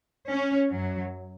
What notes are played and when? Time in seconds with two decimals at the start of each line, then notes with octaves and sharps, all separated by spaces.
0.29 C#4
0.70 F#2 F#3